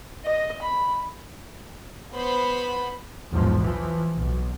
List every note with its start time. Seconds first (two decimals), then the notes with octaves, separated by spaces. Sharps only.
0.25 D#5
0.62 B5
2.13 B3 C5 B5
3.31 B1 E2 G#2 F3
3.61 E3 F3
4.18 B1